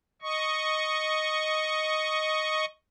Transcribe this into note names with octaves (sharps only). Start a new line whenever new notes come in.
D#5 C#6